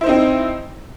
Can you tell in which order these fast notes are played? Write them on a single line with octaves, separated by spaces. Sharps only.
E4 C5 D#4 C4